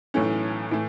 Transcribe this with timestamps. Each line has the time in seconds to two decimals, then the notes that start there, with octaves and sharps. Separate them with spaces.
0.14 B1 A2 E3 A3 C#4
0.71 A2 E3 A3